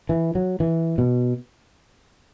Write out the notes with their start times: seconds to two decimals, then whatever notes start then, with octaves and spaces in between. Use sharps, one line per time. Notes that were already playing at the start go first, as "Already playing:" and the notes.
0.09 E3
0.35 F#3
0.60 E3
0.98 B2